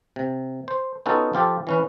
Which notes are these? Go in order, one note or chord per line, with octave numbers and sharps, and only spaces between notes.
C3
C5
B3 C#4 D#4 F4 F#4 A4
F3 F4 G4 A4
E3 C#4 B4